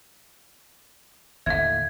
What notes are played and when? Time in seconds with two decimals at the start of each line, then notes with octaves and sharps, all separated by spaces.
1.46 D#2 A2 D3 E5 F5 G#6